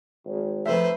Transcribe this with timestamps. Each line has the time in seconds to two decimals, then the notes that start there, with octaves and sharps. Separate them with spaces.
0.25 G#1
0.66 F1 F2 A3 B4 C5 E5